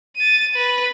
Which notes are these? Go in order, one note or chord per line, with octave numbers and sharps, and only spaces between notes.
A6 D#7
B4